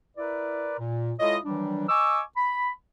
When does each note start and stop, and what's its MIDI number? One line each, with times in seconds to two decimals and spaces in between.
0.17 0.74 64
0.17 0.74 70
0.17 0.74 71
0.17 0.74 74
0.79 1.13 46
1.20 1.37 56
1.20 1.37 64
1.20 1.37 65
1.20 1.37 69
1.20 1.37 73
1.20 1.37 75
1.45 1.86 51
1.45 1.86 52
1.45 1.86 54
1.45 1.86 55
1.45 1.86 62
1.89 2.20 75
1.89 2.20 80
1.89 2.20 85
1.89 2.20 86
1.89 2.20 88
2.37 2.70 83